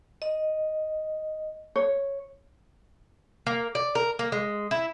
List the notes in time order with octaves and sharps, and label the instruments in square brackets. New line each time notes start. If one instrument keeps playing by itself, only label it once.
[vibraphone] D#5
[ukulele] C#5
[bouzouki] A#3
D5
A#4
A#3
G#3
E4